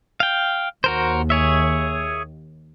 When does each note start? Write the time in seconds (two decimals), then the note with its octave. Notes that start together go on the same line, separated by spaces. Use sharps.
0.20 F5 G5
0.84 D#2 F#4 A#4 C5
1.30 G#4 C#5 E5